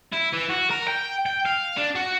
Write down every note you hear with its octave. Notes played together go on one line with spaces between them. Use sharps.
E4
E3
F#4
A#4
G5
G5
F5
D4
F#4